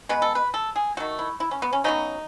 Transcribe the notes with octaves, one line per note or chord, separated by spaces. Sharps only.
B2 G#3 B3 B4
A4
B4
A4
G#4
D#3 A3 F#4
E4
E4
C#4
B3
C#4
C#3 F#3 B3 D#4